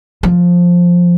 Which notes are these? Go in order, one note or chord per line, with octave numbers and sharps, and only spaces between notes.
F3